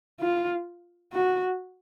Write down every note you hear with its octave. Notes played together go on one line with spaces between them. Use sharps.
F4
F#4